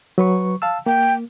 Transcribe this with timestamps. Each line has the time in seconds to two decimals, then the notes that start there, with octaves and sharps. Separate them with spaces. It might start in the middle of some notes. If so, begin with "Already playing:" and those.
0.18 F#3 B4 C#6
0.62 F5 A5 E6
0.86 A#3 G5